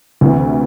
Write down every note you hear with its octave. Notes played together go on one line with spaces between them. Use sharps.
D2 C3 E3